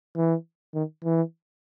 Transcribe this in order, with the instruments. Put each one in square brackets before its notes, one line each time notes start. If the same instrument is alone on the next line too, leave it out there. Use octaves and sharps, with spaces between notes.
[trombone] E3
D#3
E3